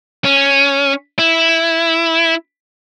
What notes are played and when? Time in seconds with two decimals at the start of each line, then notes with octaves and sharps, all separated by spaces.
0.24 C#4
1.19 E4